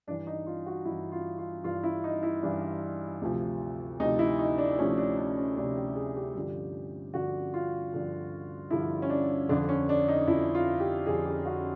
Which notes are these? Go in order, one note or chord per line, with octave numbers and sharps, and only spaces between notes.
G2 E3 D4
D#4
F4
F#4
G2 E3 E4
F4
F4
G2 E3 F4
E4
D#4
E4
G2 E3 D4
D2 C3 F3
D2 C3 F3 D#4
E4
D#4
D4
D2 C3 F3 C#4
D4
D4
C#4
D2 C3 F3 D4
G4
G#4
G4
G2 D3 F3
G2 D3 F3 F#4
F4
G2 D3 F3
G2 D3 F3 E4
C#4
D4
F2 D3 F3 D4
C#4
D4
D#4
F2 D3 F3 E4
F4
G4
F2 D3 F3 G#4
G4
F#4